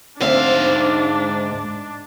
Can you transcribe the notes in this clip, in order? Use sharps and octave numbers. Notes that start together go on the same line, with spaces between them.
D2 G#2 C4 D4 E5 F5